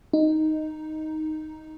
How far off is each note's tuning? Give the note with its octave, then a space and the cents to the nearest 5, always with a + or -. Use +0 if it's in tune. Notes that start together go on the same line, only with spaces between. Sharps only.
D#4 +0